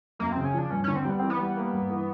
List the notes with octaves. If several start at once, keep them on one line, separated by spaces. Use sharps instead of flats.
F#2 A#3
C#3 C4
C#4
F3 D4
G2 C#4
D3 C#4
C4
G3 B3
E3 C4
B3
G3
A#3
G2
E3